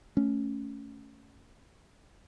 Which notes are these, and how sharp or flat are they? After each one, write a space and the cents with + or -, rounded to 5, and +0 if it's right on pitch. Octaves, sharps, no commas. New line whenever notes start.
A3 +0 C#4 +5